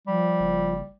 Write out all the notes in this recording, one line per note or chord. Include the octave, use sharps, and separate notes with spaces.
F3 G3
F#1